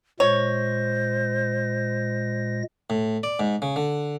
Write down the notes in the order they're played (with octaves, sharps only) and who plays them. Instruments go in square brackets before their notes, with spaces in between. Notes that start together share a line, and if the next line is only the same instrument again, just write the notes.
[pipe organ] A#2 G#3 A#6 [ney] C5 [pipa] C#5
[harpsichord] A2
D5
G#2
C#3
D3